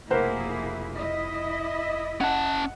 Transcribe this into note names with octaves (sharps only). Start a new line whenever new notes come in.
F1 B1 A#3 E4 G#4 A#4 C5 F#5
E4 D#5 E5
C#4 F#5 A5